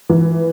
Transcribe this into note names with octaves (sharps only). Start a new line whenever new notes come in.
E3